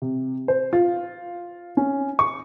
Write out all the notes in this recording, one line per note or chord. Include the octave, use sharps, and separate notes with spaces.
C3
C5
F4
C#4
C#6